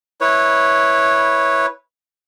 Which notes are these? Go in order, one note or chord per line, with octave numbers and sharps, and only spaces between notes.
E4 B4 C#5